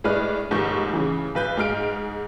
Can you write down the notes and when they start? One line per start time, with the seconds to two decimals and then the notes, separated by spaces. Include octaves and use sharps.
0.04 A2 G#3 D4 B4 F6
0.51 F1 D#2 G#2 C#6 G6
0.94 C#3 E3
1.35 B1 B4 G6
1.57 G#2 G#3 F6 D7